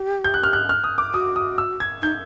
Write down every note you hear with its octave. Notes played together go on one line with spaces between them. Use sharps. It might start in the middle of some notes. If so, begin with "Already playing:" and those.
Already playing: G4
G6
F#6
F6
F#6
F6
D#6
D6
F#4 D#6
D#6
E6
G#6
D#4 G6